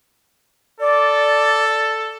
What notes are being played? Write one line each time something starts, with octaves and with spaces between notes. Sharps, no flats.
A4 D5